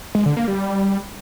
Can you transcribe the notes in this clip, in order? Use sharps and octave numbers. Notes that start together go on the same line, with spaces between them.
G#3
D3
A#3
G3